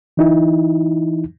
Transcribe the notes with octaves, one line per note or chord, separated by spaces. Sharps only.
E3 D#4 E4